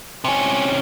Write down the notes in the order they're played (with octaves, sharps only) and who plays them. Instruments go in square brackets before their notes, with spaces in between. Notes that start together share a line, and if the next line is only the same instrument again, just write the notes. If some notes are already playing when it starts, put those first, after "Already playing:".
[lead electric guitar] C3 C#4